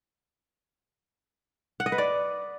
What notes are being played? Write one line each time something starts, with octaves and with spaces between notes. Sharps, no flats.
F#5
D#5
B4
D5